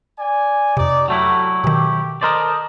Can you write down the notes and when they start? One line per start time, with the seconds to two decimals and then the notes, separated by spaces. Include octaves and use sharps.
0.19 D5 G#5
0.77 F2 C3 D#4 D5
1.08 F#3 G3 A3 E4 F#4 A4
1.64 B2 D#3 G4
2.21 A4 A#4 C5 D5 D#5